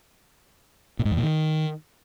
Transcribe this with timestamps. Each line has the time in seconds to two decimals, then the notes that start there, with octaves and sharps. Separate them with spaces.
0.99 A#2
1.05 G#2
1.11 E2
1.17 A#2
1.23 D#3